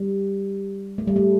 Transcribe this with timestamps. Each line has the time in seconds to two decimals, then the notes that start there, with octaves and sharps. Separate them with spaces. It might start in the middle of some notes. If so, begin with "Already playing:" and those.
Already playing: G3
0.98 A3
1.08 G3
1.16 A3